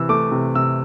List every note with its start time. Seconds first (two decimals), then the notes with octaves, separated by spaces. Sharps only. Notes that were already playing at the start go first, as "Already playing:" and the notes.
Already playing: C3 E3 E6
0.09 A3 D6
0.32 C3
0.55 C3 E6